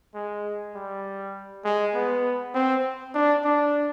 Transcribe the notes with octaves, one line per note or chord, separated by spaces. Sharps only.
G#3
G3
G#3
B3
C4
D4
D4